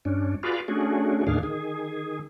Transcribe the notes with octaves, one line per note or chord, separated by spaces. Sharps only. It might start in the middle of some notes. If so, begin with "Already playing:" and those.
G2 C#4 D4
F4 F#4 G#4 B4 D5 F5
A3 C#4 D4 F#4 G#4
D#2 A2 D#3 D4 G#4 F5
D#3 G#4